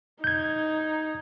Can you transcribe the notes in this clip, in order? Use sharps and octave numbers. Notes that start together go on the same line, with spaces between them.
D#4 G6 G#6